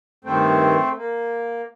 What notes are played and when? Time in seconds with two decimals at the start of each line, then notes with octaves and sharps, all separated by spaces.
0.24 G2 D#3 A3 C4
0.97 A#3